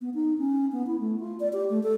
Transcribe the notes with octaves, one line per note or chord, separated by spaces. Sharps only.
B3
D#4
C#4
B3
E4
A3
F4
D5
G4
A3
A4